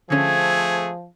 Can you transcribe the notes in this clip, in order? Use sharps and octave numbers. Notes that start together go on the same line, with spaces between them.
D3 F3 A3 C4 C#4 G#4 G#6